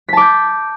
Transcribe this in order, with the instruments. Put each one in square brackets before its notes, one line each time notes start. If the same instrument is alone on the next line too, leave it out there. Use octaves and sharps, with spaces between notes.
[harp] B6
A5
D6
G6